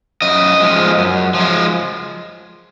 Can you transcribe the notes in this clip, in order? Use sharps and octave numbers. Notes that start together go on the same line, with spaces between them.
F#2 D#5
F3 G#3
F#2
F3
G#3